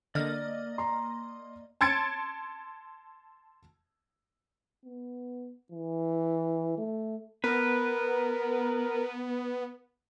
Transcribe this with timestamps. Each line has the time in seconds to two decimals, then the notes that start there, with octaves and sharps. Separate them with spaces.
0.15 D3 A#3 D5 D#5 F6
0.78 A#5 C6
1.81 A5 C6 G#6 A6 C#7 D7
4.85 B3
5.71 E3
6.78 A3
7.44 B3 A#4 B4